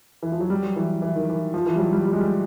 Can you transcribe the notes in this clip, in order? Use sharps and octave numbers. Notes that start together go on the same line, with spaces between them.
E3
F3
F#3
G3
F#3
E3
E3
D#3
E3
F3
E3
G3
F#3
G3
G3
G#3
G3